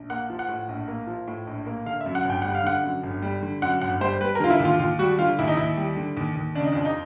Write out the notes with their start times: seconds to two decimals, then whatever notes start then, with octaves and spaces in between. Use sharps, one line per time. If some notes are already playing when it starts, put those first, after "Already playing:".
Already playing: A#1
0.10 A#3 F#5
0.30 F3
0.39 F#5
0.49 A2
0.69 A#1
0.88 A#3
1.07 F3
1.27 A2
1.47 A#1
1.67 A#3
1.86 D3 F5
2.01 E5
2.06 F#2
2.15 F#5
2.25 G1 G5
2.42 G3 F#5
2.55 F5
2.64 D3 F#5
2.83 F#2
3.03 G1
3.22 G3
3.43 D3
3.62 F#2 F#5
3.81 G1 F#5
4.01 G3 C5
4.20 G3 B4
4.35 A#4
4.40 D3 F4
4.50 E4
4.59 D#2
4.65 F4
4.79 D#2 F4
4.99 G3 F#4
5.19 D3 F4
5.39 D#2 E4
5.48 D#4
5.57 D#2 E4
5.77 G3
5.97 D3
6.17 D#2
6.36 D#2
6.55 C#3 D4
6.64 D#4
6.73 F2 D4
6.85 D#4